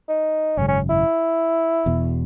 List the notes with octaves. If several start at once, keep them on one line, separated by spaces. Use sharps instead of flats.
D#4
G#1 F#2 C#3 G#3 C#4
C#4
E4
E1 E2 B2